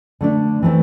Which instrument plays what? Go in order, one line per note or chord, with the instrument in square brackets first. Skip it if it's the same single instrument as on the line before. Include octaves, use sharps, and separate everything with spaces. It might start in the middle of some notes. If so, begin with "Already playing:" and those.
[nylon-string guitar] D3 A3 D4
E3 A3 C4